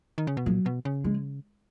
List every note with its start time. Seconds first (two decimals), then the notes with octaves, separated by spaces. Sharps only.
0.18 D#3
0.27 C#3
0.37 B2
0.46 A#2 F#3
0.66 B2
0.85 C#3
1.04 G#3